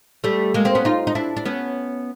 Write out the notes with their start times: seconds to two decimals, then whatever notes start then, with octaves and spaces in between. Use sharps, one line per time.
0.24 G3 A3
0.54 G#3 A#3
0.65 A#3 C4
0.75 B3 C#4
0.85 D#4 F4
1.07 D#4
1.15 D4 E4
1.37 D4
1.45 B3 C#4